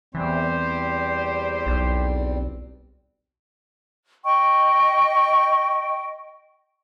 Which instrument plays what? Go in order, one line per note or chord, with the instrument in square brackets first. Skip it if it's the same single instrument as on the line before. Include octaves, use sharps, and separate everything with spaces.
[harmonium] E2 G3 C4 [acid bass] E3 [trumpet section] G4 C5
[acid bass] B1
[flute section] D#5 G5 C#6